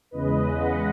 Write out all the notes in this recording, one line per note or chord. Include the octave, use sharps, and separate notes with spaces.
E2 C#3 G#3 B4 D#5
D#5 F#5